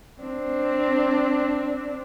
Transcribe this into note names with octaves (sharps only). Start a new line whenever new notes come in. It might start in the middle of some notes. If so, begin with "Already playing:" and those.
C4 D4